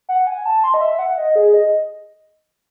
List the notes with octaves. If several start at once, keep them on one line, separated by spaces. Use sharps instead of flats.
F#5
G#5
A5
C6
D#5
E5
F#5
D#5
G#4
D#5